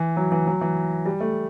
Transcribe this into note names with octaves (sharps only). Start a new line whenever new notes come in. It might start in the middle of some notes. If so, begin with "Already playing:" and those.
Already playing: E3
F#3
E3
F#3
E3
G3
A3